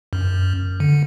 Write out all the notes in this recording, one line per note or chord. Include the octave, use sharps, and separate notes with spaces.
F#2
D3